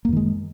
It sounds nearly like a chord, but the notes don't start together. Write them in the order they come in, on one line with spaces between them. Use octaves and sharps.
A#3 F#2 D#3 G#3